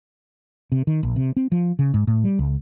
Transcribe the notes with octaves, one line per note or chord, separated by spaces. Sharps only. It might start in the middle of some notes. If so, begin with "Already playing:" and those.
C3
D#3
A#1
C3
C4
F3
C#3
G#2
A2
G3
C#2